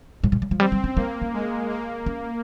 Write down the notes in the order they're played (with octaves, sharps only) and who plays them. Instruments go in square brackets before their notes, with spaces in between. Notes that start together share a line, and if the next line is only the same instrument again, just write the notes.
[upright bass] G#2
A#2
C#3
F3
[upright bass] G3 [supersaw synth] C4
[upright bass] G3
C#4
[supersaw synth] A#3 [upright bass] D#4
[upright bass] C#4
[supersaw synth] G#3
A#3
[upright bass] C#4